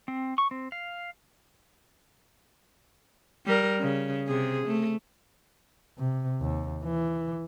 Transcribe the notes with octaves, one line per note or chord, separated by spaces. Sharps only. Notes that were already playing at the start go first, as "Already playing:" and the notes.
C4
C#6
C4
F5
G3 A#4
C#3
C3 G#4
A3
C3
D#2
E3